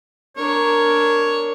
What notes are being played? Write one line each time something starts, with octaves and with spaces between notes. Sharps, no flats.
D4 A#4 C#5